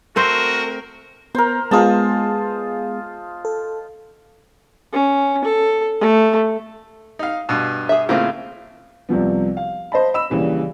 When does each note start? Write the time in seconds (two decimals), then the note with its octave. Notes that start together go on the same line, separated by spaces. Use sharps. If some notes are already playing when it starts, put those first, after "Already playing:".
0.16 A3 C4 F#4 A#4 C5
1.35 B3 A#4 C5
1.71 G#3 B3 F4 G#4 D#5 A5
3.45 A4
4.93 C#4
5.44 A4
6.00 A3
7.19 D#4 F5
7.49 G2 B2
7.89 G#4 E5
8.09 A2 C#3 A#3 C4 F4
9.09 C2 C3 F3 B3
9.57 F5
9.92 C5 D#5 A5 B5
10.14 D#5 B5 E6 E7
10.30 A#1 C#3 E3 G3